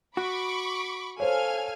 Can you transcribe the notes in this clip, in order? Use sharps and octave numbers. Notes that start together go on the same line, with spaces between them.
F#4 B5 C#6 D6
A4 C5 C#5 F5 G#5 F6